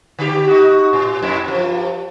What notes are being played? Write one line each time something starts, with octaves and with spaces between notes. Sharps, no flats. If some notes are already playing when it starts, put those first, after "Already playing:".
D3 G4
D#4 F#4
A2
F2 E4
G2 F3